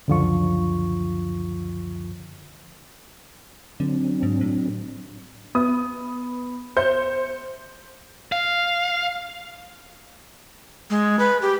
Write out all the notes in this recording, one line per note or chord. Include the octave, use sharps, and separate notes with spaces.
C#2 F#2 D3 F3 F4 C#6
D3 F#3 C4 D4
G#2
A2
B3 D#6
C5 G6 C#7
F5
G#3
B4
G4